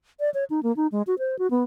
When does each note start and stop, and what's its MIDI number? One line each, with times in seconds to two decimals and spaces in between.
0.20 0.30 74
0.34 0.44 73
0.50 0.60 63
0.63 0.75 58
0.76 0.87 63
0.92 1.02 56
1.07 1.15 66
1.19 1.38 72
1.39 1.50 66
1.51 1.63 59